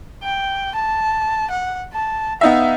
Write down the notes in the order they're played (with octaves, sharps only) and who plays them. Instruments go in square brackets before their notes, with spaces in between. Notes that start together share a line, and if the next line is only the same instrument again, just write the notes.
[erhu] G5
A5
F#5
A5
[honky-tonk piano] B3 D#4 E5 [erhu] F5